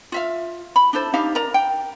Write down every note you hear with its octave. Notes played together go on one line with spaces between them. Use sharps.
F4 E5 F5
B5
D4 E4 A4 C5
D4 D#4 G4 F5
A#4 D5 A#5
G5